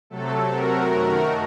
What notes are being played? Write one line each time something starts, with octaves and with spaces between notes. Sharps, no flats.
C3 F#3 A3 A4
F#4 A#4
F#2 D#3 A3